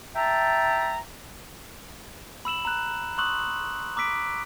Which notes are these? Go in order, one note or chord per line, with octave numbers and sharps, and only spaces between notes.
E5 G5 A5 A#5
B5 E6 E7 F#7
A#5 F#6
C6 C#6 D#6 E6 F#6 F#7
A#5 D6 E6 B6 D7